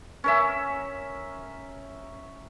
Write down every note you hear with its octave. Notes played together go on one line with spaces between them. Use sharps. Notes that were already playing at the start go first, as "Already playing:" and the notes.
C#4 A#4 E5